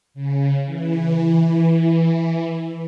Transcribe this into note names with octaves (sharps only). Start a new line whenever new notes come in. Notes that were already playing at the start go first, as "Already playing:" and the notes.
C#3
E3